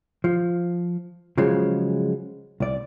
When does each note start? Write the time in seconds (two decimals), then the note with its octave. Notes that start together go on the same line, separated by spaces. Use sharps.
0.24 F3
1.38 C#3 F3 F#3 G#3
2.60 C2 D5